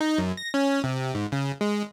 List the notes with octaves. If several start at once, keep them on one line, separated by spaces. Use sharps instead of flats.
D#4
F#2
A#6
C#4
C3
G#2
C#3
G#3